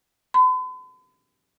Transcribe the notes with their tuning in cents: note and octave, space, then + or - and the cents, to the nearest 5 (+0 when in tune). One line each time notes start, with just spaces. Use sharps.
B5 +45